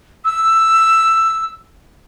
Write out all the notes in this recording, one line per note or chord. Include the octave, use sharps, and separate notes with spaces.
E6